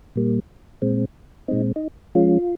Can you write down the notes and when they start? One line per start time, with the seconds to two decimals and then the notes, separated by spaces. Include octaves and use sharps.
0.16 A#2 G3 A#3
0.82 A#2 G#3 C4
1.48 A#2 G#3 C4 D#4
1.76 D#4
2.15 F3 G#3 C#4 F4